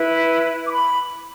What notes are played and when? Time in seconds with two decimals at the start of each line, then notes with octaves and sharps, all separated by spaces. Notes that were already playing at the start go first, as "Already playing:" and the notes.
Already playing: E4 B4
0.67 D6
0.73 B5